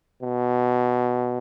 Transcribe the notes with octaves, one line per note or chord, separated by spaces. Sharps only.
B2